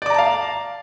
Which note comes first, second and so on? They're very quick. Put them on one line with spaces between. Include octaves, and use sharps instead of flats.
D5 D6 A#5 A5 F5